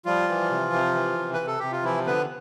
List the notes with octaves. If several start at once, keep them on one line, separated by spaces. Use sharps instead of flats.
F3 G3 F4
E3
C3
C3
E3
C3
B4
C3
A4
C3 G4
F4
E3 F3 E4
D3 B3 B4